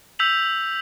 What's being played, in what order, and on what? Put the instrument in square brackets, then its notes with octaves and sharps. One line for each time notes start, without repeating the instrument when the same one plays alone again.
[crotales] E6 G6 B6 F7 F#7